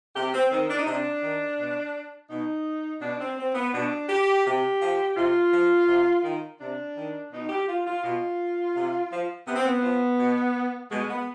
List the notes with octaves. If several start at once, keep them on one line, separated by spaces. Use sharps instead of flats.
C3 G4
C4
D#3 C4
D4
D#4
C3 D4
D#3
B2
B2 D#4
B2 D4
C4
C4
B3
B2 D4
G4
C3 G4
F3
C3 F4
F3
C3
D#3
C3 D4
D#3
B2 D#4
G4
F4
F4
B2 F4
C3
F3
C3 B3
C4
B3
F3
B2
B2 G#3
B3